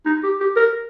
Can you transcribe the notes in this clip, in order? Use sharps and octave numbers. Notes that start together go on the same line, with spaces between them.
D#4
G4
G4
A#4